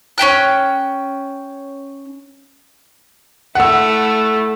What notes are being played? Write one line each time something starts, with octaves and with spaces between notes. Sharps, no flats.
C#4 E4 G5 F#6
A3 E4 F#5 E6